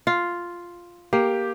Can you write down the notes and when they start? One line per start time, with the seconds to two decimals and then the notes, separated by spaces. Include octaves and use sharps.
0.07 F4
1.13 A#3 G4